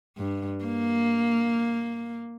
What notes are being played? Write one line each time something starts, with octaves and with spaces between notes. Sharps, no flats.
G2
A#3